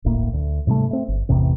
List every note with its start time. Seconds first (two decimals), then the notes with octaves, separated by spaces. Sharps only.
0.04 D1 G1 A2 A#3
0.33 D2
0.67 G#2 C3 G3 A3
0.91 A3 C4
1.08 G1
1.29 A1 E2 C3 C4